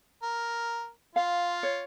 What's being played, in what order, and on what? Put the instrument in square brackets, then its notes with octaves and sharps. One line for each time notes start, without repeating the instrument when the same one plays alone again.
[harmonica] A#4
[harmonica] F4 [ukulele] F5
[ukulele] C#5